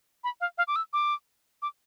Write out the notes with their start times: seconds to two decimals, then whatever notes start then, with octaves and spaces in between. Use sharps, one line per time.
0.24 B5
0.40 F5
0.58 F5
0.68 D6
0.76 E6
0.93 D6
1.62 D6